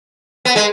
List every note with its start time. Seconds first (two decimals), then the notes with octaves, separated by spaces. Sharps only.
0.45 B3
0.56 G#3